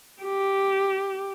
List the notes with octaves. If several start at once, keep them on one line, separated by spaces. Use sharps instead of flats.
G4